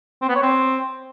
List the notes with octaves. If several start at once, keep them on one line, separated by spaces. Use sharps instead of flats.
C4
B3
C#5
C4